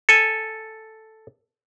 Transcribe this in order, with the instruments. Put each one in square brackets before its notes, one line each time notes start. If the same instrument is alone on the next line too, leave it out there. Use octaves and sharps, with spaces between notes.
[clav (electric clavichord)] A4 G#5